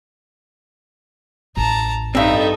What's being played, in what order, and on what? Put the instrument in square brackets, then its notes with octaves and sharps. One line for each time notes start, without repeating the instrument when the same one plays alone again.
[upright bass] A1 F2 [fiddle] A5 A#5
[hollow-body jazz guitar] G2 C4 [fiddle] D#4 E5 [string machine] A4 D#5 A5